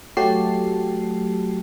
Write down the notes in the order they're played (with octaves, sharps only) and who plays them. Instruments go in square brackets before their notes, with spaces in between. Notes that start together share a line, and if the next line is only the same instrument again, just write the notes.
[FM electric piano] F#3 A3 F#4 G4 A5 C7